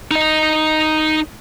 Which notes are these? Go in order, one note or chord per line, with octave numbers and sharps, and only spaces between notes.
D#4 D#5